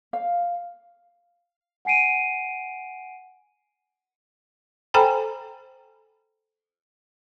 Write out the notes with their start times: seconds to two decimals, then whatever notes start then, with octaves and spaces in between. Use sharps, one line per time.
0.13 F5
1.85 F#5 G#5 C7 D7 D#7
4.94 A4 C5 G5 G#5 A#5 B5